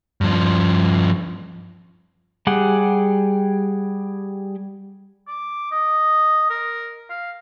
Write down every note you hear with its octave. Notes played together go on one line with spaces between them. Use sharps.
G2 F3
G3 G4 G#4 F#5
D6
D#5
A#4
F5